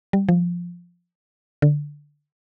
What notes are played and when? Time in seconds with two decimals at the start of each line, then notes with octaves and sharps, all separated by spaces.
0.13 G3
0.29 F3
1.62 D3